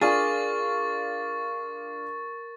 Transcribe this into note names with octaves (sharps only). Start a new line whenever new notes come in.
D4 F4 G#4 A#4 D5 C#6 A6